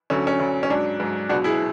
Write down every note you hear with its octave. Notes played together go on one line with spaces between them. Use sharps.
D2 D3 F#3 C#4
C#4
D2 D3 F#3
C#4
G#2 F#3 D4
G#2 F#3
C#2 B2 F#3 D4 F#4
E4 G#4